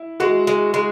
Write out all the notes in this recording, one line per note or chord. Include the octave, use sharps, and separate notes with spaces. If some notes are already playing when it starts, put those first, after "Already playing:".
Already playing: E4
G#3 F#4
G#3
G#3